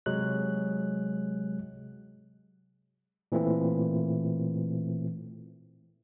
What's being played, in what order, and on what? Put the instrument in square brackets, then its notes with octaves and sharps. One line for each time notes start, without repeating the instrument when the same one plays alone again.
[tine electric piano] C3 F#3 G#3 F#6
A#2 E3 A3 C4